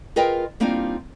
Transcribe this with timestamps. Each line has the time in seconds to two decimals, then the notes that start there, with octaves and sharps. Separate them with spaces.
0.16 F4 G#4 A#4 B4 D#5 G5
0.60 G3 A#3 C4 D4 D#4 F4